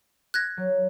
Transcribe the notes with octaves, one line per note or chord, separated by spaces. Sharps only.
F#6 G#6 A#6
F#3